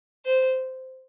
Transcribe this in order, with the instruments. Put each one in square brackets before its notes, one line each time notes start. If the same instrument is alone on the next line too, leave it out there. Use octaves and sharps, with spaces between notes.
[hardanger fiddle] C5